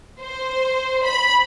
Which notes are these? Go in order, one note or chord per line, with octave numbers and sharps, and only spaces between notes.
C5
B5